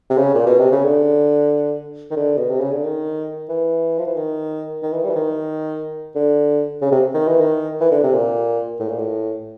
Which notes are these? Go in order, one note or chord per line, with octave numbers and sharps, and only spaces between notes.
C3
C#3
A#2
B2
C3
C#3
D3
D#3
D3
B2
C3
C#3
D3
D#3
E3
F3
E3
D#3
D#3
E3
G3
E3
D#3
D3
C#3
C3
D#3
E3
D#3
E3
D3
C3
A#2
A2
A#2
A2